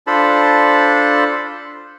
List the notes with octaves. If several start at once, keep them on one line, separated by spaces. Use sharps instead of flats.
D4 F4 A4 C5 A5 B5